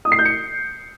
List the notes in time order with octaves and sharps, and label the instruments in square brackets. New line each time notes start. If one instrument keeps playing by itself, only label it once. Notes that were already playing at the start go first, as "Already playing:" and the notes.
[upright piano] D#6
C7
G6
C#7